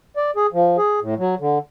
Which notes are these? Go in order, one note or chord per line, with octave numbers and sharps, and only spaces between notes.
D5
G#4
F3
G#4
A2
F#3
D3